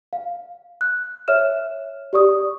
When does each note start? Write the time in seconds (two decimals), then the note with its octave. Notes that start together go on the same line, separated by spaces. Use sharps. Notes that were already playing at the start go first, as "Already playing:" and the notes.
0.13 F5
0.81 F#6
1.28 C#5 E5 F6 E7
2.13 G4 D5 C#6 D#6